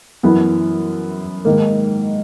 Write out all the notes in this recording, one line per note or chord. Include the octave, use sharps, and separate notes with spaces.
F#2 E3 B3 E4
G#2 D#3 A#3